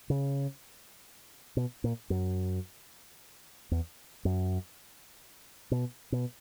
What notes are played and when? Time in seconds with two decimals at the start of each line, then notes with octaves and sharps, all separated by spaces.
0.10 C#3
1.57 B2
1.84 A#2
2.10 F#2
3.71 E2
4.25 F#2
5.71 B2
6.12 B2